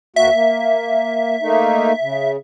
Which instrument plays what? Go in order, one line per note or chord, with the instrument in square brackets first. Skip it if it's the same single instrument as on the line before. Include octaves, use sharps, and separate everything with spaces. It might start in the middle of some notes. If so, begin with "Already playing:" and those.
[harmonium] D2 A#3 F#4 [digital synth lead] E5
[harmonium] A#3
A3 A#3 D#4
C#3